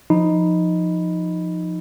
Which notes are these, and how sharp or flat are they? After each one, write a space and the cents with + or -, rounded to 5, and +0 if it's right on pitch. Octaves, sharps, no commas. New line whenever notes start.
F3 +0 D#4 +0 B5 +0